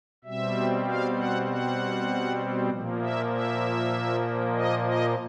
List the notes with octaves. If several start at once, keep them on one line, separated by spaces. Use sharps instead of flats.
B2 G3 C4 E5
F5
F#5
F#5
A#2 F3 A#3
E5
E5
D#5
D#5